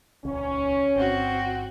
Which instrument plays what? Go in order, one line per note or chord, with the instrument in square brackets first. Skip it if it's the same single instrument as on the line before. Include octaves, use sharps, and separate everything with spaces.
[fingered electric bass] D#1 C#2 [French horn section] C#4
[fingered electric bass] G1 [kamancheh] C4 F#4